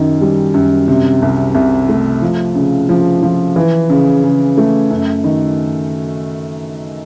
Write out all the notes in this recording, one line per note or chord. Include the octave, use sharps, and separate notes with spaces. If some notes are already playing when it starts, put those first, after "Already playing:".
Already playing: F#2 D#3
G3
F#2
C3
C2
C2
A3
F3
C#3
F3
F3
E3
C#3
C#3
A3
F#2
D#3